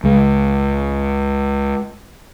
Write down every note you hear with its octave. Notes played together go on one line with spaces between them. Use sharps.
C#2 G#3